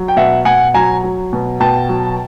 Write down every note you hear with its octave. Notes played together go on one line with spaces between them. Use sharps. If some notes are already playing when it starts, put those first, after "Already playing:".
Already playing: F#3
G5
B2 E5 F#5
B2 F#5 G#5
F#3 G#5 A#5
F#3
B2
B2 G5 A5
F#3